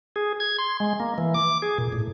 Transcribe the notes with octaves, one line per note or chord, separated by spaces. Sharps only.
G#4
G#6
C6
G#3
A#3
E3
D6
G#4
A#2
A2